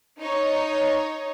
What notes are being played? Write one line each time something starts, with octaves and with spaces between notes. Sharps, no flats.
D#4 C#5